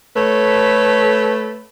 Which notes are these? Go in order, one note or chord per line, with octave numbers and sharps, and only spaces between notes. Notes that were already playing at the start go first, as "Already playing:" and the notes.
A3 A4 B4 C#5